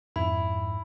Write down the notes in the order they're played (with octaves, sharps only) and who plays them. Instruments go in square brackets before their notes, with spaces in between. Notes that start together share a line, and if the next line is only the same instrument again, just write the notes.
[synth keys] F2 [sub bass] G#2 [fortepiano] E4 [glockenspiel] B5